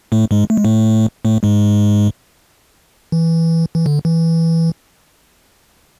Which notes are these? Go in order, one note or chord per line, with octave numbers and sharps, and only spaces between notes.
A2 A3
G#2 G#3
A3
G#3
A2 A3
A2 A3
G#2 G#3
E3
E3
D3
E3